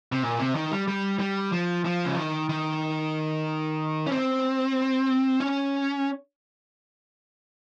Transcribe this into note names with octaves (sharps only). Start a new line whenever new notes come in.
C3
A#2
C3
D#3
G3
G3
G3
F3
F3
C#3
D#3
D#3
C#4
C4
C#4